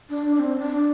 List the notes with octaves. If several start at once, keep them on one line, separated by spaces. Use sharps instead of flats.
D4
D4
C4
D4